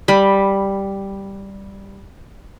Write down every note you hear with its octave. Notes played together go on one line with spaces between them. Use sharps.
G3 B5